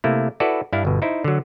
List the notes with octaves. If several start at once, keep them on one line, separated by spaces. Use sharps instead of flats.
C3 A3 A#3 E4
E4 F#4 A4 B4 D5
G2 D4 E4 F5
G1 B2
D#4 E4 C5
D3 F#3